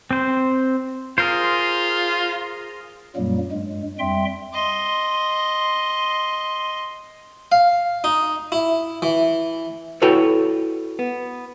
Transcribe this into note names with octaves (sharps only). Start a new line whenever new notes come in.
C4 C5
F4 G#4 A#4 C5
F#2 A#2 F#3 G3 A#3
G2 G#3
F2 G3 E5 G5 C6
D#5 C6
F5
D#4
E4
E3
E4 F#4 A4 B4 C#5 G5
B3